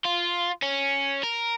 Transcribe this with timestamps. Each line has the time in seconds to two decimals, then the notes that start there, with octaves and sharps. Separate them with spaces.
0.05 F4
0.62 C#4
1.23 A#4